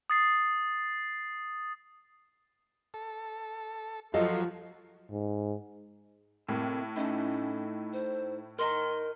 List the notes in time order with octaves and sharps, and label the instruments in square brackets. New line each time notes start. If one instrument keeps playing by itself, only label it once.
[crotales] D#6 A6 C7
[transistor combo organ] A4
[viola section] F3 [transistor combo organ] F#3 [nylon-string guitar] A4 D#5 F5
[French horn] G#2
[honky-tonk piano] A2 [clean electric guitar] C3 A#3
[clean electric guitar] A3 D#4 E4 [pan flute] C#4
[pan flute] C5
[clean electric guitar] A#4 D#5 A#5 [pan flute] C6